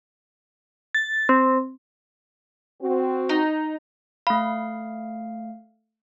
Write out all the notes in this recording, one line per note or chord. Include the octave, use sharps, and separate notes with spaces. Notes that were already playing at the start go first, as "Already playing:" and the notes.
A6
C4
C4 F#4
D#4
A3 F5 B5